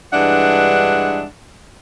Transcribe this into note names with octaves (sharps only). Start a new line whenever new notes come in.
G2 E3 G#3 D4 E5 F#5